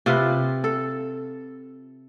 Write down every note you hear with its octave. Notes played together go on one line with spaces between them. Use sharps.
C3 F4 B4
A4